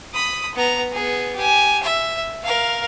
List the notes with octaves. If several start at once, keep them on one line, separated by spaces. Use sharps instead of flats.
B5 D#6
B3 A#5
B3 G#4
G4 G#5
E5
A#4 F5